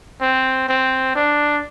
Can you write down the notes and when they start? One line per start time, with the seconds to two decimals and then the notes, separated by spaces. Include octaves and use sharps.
0.21 C4
0.68 C4
1.16 D4